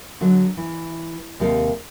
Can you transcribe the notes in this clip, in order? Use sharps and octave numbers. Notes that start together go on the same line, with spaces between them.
D3 F#3 G#3
E3
D#2 C3 G#3 A4 F5